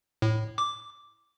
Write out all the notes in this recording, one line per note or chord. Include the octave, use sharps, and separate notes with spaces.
A2
D6